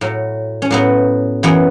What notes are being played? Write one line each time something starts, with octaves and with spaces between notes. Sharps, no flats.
A2 F#3
C#4
A2 F#3 B3
F#2 E3 B3